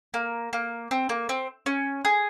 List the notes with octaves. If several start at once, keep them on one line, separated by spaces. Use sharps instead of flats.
A#3
A#3
C4
A#3
C4
C#4
G#4